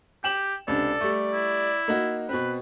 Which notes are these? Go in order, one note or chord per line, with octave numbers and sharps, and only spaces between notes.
G4 G5 E7 F#7
C#2 C3 D4 A4 D5
G3 A3
E4
A#3 D#4 F#4
B2 C4 B4